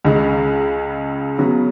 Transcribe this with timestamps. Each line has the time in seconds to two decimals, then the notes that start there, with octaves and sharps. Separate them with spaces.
0.05 C#2 C#3 G#3
1.39 C#3 F#3 B3